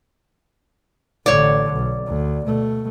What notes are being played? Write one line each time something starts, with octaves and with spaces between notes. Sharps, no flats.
A1 D3 C#5 D5
B1
D2
B2 A3